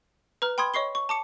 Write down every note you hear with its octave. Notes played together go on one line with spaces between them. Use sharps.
B4 A#5 F6
G5 B5 C6 D#6 G#6
C#5 D#5 C#6 C7 G7
C#6
A5 D6 C#7